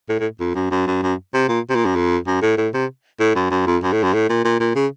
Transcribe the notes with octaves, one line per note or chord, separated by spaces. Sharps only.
A2
A2
F2
F#2
F#2
F#2
F#2
C3
A#2
C3
A#2
F#2
F2
F#2
A2
A2
C3
A2
F#2
F#2
F2
F#2
A2
F#2
A2
A#2
A#2
A#2
C#3